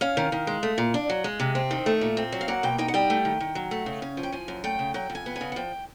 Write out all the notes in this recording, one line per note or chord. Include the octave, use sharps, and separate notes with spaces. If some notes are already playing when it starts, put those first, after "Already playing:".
C#4 F5
D#3
D#3
G#3
A3
A#2
D4
F#3
G#3
C3
C4
D#3
A3
A#2
C4
F#3
F5
A#3 F#5
B2 G5
D#4 G5
F#5
G3 G5
A3
D#3
D#3
F#3
A3
C#3
C#4
F3
G5
F3 G#5
F#2
A3 G5
C#3
F#3 G5
F2
G#5
B3
G#5
C#3
F#5
F3 G5